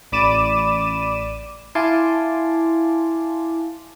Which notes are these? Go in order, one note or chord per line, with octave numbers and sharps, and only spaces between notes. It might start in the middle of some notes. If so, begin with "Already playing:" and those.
A1 D5 B5 D6 D#7 E7
E4 F5 G#5 A5 C6 D6